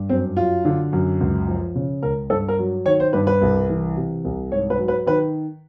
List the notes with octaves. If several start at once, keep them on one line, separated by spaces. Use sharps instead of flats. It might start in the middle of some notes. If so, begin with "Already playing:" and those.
Already playing: G2
F#2 C4
F#3 F4
D3
F#2
C#2
F3
C#3
C#2 A#4
G2 A4
A#4
F#3
D#3 C#5
C5
G2 B4
B4
C2
E3
C3
C2
G#2 C#5
B4
F#3
B4
D#3 B4